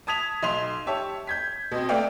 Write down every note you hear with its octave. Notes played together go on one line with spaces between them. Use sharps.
A5 D#6 G#6 B6 F7
B1 C6 F7
G4 C#5 E5 A5
G6 G#6 B6
B2 C4
A3 B3 D5 F5 G5